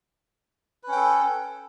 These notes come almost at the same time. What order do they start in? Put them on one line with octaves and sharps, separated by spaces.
B4 C#4 G5 A4